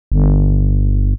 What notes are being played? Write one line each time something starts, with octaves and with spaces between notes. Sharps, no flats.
G1